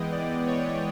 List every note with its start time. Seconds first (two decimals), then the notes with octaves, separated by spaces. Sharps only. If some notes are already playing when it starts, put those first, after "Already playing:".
Already playing: E3 G#3 B3 D#5 G5
0.12 D5
0.47 C#5